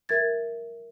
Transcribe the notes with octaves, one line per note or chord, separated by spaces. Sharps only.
A#4 E5 G#6 A6